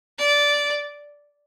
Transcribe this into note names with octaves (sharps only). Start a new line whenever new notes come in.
D5